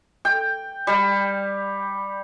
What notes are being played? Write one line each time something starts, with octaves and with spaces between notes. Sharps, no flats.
G5
G3